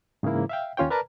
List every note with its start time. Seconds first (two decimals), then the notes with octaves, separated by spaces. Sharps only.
0.23 G#2 C#3 E3 A#3 E4
0.49 E5 F5 G5
0.77 D#2 C#4 F4 C#5 G5
0.90 A#4 B4 D5 A5 A#5